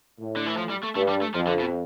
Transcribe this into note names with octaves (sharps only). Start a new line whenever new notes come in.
A2
D3
E3
F3
G3
A3
G2 A3
G3
A3
F2 F3
D3
B2